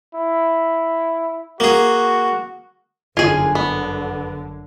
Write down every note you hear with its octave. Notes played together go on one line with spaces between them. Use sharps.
E4
A#3 F#4 G#4
G1 F#2 D3 F4 G#4 G#5 G#6 C7
B3